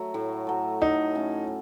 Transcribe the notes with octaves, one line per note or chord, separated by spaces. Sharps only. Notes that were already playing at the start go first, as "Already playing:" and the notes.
Already playing: F#3 A3
A2
F#3 A3
A2 D#4
A3 C#4